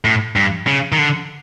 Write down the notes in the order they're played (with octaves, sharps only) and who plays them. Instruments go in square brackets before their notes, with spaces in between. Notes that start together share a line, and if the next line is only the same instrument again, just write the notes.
[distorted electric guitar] A2
G2
C#3
D#3
D3